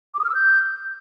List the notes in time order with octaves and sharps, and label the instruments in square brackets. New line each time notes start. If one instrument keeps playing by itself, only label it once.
[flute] D6
D#6
F6
E6
G6